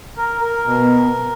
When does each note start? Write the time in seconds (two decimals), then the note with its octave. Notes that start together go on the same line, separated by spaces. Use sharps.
0.17 A#4
0.41 A#4
0.65 B2